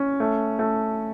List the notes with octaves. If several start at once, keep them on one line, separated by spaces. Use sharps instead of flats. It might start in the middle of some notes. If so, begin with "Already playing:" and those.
Already playing: C#4
A3
A3